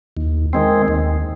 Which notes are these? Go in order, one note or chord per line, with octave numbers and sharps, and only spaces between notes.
D#2
D#3 G#3 C4
D#2